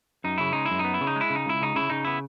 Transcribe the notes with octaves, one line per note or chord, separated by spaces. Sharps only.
F#2 D#4
C#3 E4
G#3 D#4
F#2 E4
D#4
B3
E4
C#3
D#4
G#3
E4
C#3
D#4
C#2 E4
C#3 D#4
C#3 E4
C#3 D#4
B3 E4